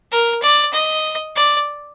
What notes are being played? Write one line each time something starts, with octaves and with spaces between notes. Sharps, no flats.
A#4
D5
D#5
D5